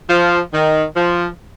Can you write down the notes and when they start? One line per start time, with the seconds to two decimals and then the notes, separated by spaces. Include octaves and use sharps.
0.09 F3
0.53 D#3
0.96 F3